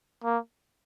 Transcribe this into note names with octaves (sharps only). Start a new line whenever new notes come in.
A#3